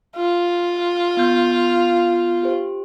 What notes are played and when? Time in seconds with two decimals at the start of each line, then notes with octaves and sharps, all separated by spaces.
0.16 F4
1.17 B3 G6
2.43 G4 C5